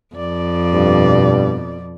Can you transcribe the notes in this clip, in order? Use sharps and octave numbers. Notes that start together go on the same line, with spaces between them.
F2 D5
G2 B2